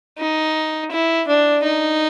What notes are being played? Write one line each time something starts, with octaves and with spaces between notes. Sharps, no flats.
D#4
E4
D4
D#4